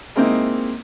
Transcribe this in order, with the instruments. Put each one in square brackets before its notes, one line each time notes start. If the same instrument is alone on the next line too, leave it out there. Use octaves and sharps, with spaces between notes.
[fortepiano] G#3 A#3 C4 D#4 E4